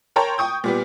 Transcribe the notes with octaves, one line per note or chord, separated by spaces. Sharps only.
A#4 C#5 G5 A5 A#5 C6
G5 C#6 D#6 G6
A#2 G3 B3